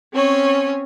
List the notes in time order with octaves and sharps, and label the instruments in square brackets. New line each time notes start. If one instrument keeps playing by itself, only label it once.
[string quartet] C4 C#4 C#5